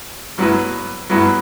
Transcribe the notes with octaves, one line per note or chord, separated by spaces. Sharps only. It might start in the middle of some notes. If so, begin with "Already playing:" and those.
G2 F#3 B3 E4 B4
G2 F#3 B3 E4 B4